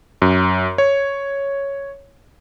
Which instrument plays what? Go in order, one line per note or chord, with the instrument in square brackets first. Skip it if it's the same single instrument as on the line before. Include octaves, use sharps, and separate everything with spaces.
[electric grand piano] F#2
C#5